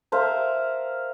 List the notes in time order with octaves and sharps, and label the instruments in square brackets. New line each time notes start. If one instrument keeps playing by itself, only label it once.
[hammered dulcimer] A#4 C5 E5 F5